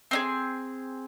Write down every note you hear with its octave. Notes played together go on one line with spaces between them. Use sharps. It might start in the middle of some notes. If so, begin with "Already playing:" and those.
C4 D#4 G#4